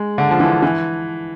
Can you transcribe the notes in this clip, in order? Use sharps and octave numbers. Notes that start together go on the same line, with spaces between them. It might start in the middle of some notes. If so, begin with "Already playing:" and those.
Already playing: G#3
D3
F3
E3
E3